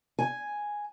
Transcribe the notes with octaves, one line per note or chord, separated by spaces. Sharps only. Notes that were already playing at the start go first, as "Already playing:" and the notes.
G#5